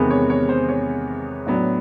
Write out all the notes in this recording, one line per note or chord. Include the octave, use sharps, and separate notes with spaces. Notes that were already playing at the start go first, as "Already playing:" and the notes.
Already playing: E2 C3 D#3 G#3 B3
C#5
C#5
C5
C#5
A2 F#3 B3 D4